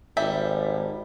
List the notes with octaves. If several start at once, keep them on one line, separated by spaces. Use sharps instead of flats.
G#1 G3 A4 E5